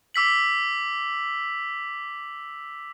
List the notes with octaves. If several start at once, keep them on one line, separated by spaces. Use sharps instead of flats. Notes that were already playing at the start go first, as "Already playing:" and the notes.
D6 E6 B6 F#7